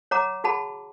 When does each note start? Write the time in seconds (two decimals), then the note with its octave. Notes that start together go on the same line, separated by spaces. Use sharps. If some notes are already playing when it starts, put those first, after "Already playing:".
0.11 C#5 F#5 A#5 D6
0.44 F#4 G#4 F#5 A5 B5